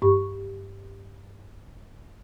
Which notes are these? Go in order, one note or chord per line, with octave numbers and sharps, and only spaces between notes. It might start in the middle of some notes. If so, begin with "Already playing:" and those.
G2 G4 C#6